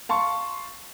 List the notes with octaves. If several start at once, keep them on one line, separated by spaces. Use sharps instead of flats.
F5 A5 C6 C#6